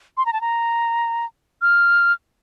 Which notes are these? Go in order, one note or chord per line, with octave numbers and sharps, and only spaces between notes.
C6
A#5
A5
A#5
F6